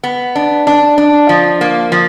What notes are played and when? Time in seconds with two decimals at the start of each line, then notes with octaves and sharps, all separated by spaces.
0.04 B3
0.35 D4
0.67 D4
0.98 D4
1.29 F3
1.61 A#3
1.92 F3